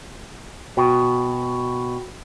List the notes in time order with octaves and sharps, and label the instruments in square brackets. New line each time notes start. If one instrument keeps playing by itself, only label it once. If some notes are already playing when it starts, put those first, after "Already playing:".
[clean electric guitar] B2 [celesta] F#4 G5